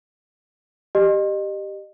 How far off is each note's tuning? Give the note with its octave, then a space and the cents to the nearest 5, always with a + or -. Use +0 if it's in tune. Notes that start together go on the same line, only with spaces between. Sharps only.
G4 +0 D#5 -30